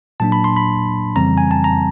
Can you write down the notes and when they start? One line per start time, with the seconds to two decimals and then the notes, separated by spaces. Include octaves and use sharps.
0.20 A#2 F#3 A#3 D4 A5
0.32 B5
0.44 C6
0.57 B5
1.16 F2 C#3 E3 G3 C4 A#5
1.38 G#5
1.51 A5
1.64 A#5